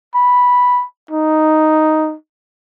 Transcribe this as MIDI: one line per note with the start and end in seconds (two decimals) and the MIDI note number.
0.15 0.84 83
1.11 2.15 63